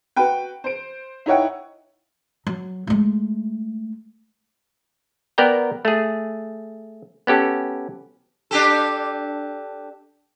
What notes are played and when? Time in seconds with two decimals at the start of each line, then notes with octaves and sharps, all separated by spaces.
0.16 F#4 B4 G5
0.64 C5 D7
1.26 D#4 E4 C#5 F#5 G5
2.47 F#3
2.87 G#3 A3
5.38 B3 A#4 D5 G5 A#5
5.85 A3 G#4
7.27 B3 C#4 G4 A4
8.51 D4 G4 A4